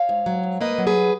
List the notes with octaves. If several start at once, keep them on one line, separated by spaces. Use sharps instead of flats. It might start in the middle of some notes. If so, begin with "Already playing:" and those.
Already playing: C#5 F5
G#2
F#3
G#2
A#3 B4 D#5
F#3
G#4 B4